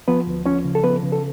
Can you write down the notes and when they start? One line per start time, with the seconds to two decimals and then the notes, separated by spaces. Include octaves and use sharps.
0.08 F3 B3 B4
0.27 D2
0.46 F3 C#4 C#5
0.65 C#3
0.75 A4
0.84 F3 B3 B4
1.03 C#3
1.12 A4